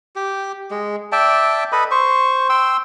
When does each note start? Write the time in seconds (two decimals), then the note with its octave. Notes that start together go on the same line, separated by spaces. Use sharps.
0.16 G4
0.71 G#3
1.12 D5 E5 G5 A5
1.72 A4 B4 D#5 B5
1.91 C5 C#6
2.50 G5 C6 E6